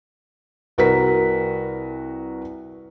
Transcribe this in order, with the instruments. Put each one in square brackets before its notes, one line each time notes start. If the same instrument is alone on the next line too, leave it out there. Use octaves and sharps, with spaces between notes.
[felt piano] C2 F#4 A#4 B4 B6